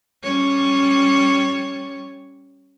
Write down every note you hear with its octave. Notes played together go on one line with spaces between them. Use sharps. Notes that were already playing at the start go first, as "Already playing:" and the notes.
G3 C#4 C#5